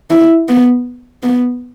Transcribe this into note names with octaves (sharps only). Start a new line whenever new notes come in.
E4
B3
B3